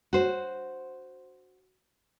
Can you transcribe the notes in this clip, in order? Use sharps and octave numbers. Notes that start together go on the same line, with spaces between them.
F#4 C5